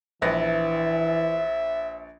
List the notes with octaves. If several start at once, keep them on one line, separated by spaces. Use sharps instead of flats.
A#1 E3 B4 E5 A#6